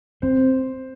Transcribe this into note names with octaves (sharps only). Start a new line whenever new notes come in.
C4 C5